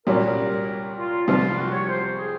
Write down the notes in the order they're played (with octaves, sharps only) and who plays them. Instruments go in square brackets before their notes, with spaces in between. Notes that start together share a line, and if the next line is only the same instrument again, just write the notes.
[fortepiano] C2 A#2 F#3 C#4 [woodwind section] A#4
[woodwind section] F4
[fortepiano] C2 C3 F3 [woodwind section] F4
[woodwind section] F#4
C#5
C5
G#4